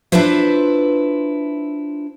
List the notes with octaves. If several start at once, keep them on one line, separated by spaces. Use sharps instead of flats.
D4 E4 F4 B4 C5 E5